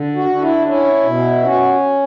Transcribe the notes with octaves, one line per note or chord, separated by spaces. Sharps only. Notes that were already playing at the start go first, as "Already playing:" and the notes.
Already playing: D3
F#4
D3
E4
C#4 E4
B2
C#4 F#4